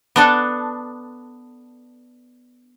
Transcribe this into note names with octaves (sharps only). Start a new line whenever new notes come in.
B3 D4 A4